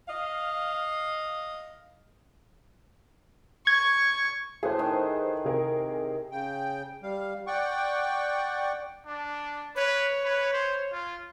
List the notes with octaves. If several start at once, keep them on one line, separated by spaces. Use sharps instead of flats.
D#5 F5
C#6 G#6
A2 G#4 B4 C5
D#3
C3 G#4 A#4
C#3 G5
G3 F5
D5 F#5 G5 C#6
D4
B4 C#5
B4
C5
F4